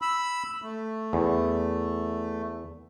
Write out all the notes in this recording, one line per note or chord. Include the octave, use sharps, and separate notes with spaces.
B5 E6
A3
E2